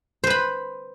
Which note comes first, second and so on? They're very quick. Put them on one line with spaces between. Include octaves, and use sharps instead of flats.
C5 B4 B5